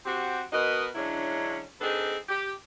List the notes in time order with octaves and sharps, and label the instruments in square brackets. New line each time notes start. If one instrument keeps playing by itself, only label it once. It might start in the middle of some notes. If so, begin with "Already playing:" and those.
[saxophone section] C4 F#4 G4
B2 F#4 A#4 B4 D#5
D3 F#3 G#3 C#4 D4 E4
C4 D4 D#4 G#4 A4 B4
G4